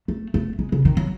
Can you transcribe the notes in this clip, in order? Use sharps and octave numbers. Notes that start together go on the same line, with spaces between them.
A3
A3
G#3
C#3
D#3
F#3